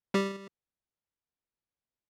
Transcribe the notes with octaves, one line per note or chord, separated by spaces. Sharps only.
G3 G4